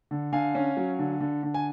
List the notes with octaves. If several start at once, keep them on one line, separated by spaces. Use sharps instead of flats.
D3
D3 F5 G#5
C#4
F#3
D3
D3
D3
G#5